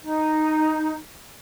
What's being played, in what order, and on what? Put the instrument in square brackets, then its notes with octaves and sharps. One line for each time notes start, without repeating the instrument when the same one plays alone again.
[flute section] D#4